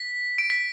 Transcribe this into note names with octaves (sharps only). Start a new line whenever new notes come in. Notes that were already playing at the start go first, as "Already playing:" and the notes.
Already playing: B6
D7
B6